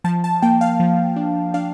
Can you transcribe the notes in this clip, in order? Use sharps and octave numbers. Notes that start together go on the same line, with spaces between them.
F3 A5
A5
A#3 G5
F5
F3
D4
D4 F5